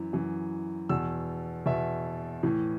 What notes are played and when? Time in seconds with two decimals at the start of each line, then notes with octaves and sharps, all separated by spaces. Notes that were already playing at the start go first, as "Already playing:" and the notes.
Already playing: F#2 E3
0.13 F#2 E3
0.89 E2 B2 E6
1.66 E2 B2 E5
2.43 A2 E3